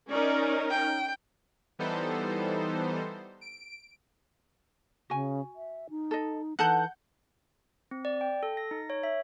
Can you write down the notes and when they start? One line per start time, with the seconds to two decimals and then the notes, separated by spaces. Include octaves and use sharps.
0.10 C#4 D#4 A#4 D5
0.70 G5
1.79 E3 G3 B3 D#4 A4 C5
3.41 D7
5.10 C#3 F#4 G#5
5.56 E5
5.90 D#4
6.11 A4 D#5
6.59 E3 D#4 A4 F#5 A5 G6
7.91 C4
8.05 D5
8.21 G5
8.43 A4
8.57 A#6
8.71 D#4
8.90 C#5
9.03 E5